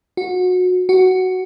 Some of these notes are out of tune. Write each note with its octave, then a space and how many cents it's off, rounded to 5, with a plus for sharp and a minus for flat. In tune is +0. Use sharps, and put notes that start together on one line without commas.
F#4 -25
F#4 +5